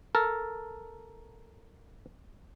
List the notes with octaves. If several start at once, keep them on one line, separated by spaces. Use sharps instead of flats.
A4 A#4